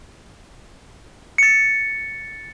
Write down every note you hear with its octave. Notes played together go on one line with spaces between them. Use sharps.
A6 C#7